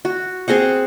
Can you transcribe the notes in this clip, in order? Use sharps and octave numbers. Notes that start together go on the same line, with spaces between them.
F#4
C4 G#4 C5 F#5